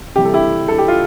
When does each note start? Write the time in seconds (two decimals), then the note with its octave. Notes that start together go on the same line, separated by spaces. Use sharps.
0.16 C3 E3 G3 G4
0.25 A4
0.34 E4 G4
0.68 A4
0.78 G4
0.88 F4